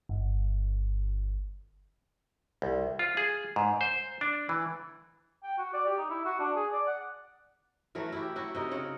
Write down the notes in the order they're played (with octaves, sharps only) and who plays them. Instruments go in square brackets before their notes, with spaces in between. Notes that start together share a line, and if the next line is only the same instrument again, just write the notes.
[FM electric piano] G1
[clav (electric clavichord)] C2
F4
G#4
G#2
C5
D4
E3
[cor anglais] G5
F#4
D5
G4
D#4
E4
F#4
D4
G#4
D5
F#5
[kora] E3 F#3 A3 A#4
E4 F#4 G4
F#3 E4 F#4
C3 D#4 A#4
C#3 C#5 F#5